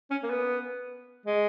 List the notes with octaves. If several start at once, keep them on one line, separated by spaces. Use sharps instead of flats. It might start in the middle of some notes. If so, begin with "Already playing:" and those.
C#4
A#3
B3
G#3